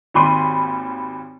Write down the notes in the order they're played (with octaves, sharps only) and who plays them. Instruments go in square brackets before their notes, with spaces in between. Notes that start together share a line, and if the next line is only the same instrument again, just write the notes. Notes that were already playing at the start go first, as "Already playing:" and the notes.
[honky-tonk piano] G#1 D#2 B5 C6 D#7